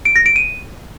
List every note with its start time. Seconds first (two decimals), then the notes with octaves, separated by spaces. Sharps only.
0.05 D7
0.16 A#6
0.26 D7
0.36 D#7